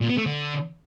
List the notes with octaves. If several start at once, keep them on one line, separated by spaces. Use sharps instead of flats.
A#2
B3
A3
D3